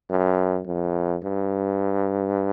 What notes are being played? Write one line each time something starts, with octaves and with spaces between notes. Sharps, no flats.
F#2
F2
G2